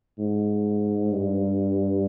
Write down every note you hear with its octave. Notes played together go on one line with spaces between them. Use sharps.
G#2
G2